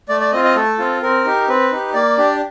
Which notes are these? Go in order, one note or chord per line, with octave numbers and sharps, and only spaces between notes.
A3 D5
D5
C4 F4 D#5
D#5
A3 A4
C4 F4
C4 A#4
D#4 G4
C4 B4
D#4 G4
A#3 D5
D4 G4